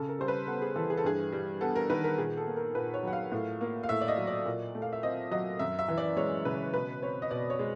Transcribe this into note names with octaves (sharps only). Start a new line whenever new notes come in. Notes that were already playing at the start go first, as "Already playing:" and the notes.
Already playing: C#3 A4
A#4
G3 C5
B4
B3 A4
G#4
E3 A4
G#4
A4
G2 G#4
G3
B3 A4
A#4
D#3 B4
A#4
A#2 G#4
A4
A#3
A#4
A#2 B4
C#5
F#3 F#5
F5
A2
A#3
F5
A2 E5
D5
D#5
F#3
D5
A#2
A3
F5
E5
C4 D#5
F#3 D#5
F#2 E5
E5
E3
D5
G#3 C#5
C#3 B4
B2 B4
C4 C#5
D#5
B2 D5
C#5
G#3